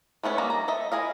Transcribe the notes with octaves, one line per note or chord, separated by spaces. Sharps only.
G#3 A3 B3 C#4 E4
D#3 G3 A#3 D#5
A#5
A4 D#5 E5
E4 G#4 D#5 F5